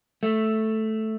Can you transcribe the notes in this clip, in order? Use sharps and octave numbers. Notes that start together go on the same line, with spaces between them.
A3